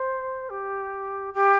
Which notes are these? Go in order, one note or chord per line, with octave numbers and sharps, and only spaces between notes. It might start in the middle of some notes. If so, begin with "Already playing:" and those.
Already playing: C5
G4
G4